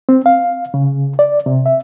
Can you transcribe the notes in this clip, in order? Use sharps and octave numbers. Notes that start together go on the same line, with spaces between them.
C4
F5
C#3
D5
C3
E5